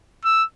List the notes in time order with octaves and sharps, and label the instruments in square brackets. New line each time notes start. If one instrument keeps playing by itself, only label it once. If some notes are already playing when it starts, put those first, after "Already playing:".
[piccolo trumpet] E6